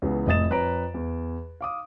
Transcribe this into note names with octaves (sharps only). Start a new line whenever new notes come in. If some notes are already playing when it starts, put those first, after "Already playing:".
C#2 C#3 E3 B3
F1 A2 D#5 D#6 A6 E7
F2 B4 C#5 A#5 D7
E2
F5 D6 D#6